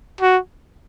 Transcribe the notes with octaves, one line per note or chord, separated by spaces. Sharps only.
F#4